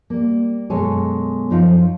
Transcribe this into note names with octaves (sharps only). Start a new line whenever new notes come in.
G3 A#3
F#2 B2 G#3 A4 C#5 G#5
F#2 F3 D#4 F4